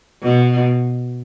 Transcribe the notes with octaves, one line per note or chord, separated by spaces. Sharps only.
B2